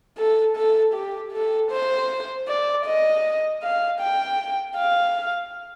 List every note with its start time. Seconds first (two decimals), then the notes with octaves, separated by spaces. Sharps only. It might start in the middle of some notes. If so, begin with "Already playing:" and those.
0.17 A4
0.56 A4
0.94 G4
1.32 A4
1.71 C5
2.48 D5
2.85 D#5
3.63 F5
4.00 G5
4.77 F5